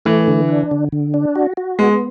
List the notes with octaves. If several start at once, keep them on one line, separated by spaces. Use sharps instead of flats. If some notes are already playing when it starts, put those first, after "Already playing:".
E3 A3
D3
D4
D3
D3
D4
F#4
F#4
G#3 B3